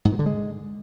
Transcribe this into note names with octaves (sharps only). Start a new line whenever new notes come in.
G#2
A#2
D3
G#3